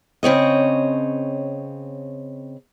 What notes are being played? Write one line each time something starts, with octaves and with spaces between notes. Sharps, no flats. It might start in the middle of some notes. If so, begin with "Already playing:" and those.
C#3 C4 C#5 D#5